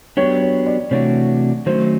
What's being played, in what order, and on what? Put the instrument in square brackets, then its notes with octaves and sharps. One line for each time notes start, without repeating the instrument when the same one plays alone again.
[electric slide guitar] F#3 B3 D4 G4 [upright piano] C#5
[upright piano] C#5
D5
[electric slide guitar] C3 E3 A3 D4 F#4 [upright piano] C#5
[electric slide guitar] D#3 F#3 A3 C#4 [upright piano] C5